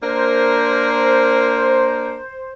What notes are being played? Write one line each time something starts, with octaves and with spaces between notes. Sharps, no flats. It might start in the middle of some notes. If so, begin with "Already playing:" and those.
A#3 D4 A#4 C5